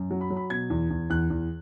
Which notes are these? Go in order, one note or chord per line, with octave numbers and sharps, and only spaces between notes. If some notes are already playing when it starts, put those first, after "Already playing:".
Already playing: F#2
F#3
B5
F#3
B5
B2 G#6
E2
E2
E2 F#6
E2